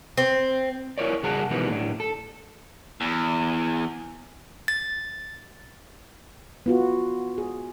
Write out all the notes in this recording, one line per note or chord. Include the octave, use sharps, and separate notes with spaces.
C4
E4 A#4 C#5 D5
C#3 G3 G#4 F#5 A5 A#5
B2 D#3 E3 G3 G#3 B3
A2 D4
A4
E2
A6
B3 F4 F#4
G#4